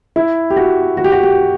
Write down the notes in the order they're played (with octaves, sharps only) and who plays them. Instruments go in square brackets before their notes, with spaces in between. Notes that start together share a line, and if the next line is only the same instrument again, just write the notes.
[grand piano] E4
G4
F#4
F#4
G4
F#4
G4